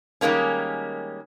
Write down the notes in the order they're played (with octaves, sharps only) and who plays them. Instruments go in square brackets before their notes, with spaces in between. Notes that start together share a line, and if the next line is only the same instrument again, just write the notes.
[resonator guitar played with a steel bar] D#3 G3 G#3 A#3 C#4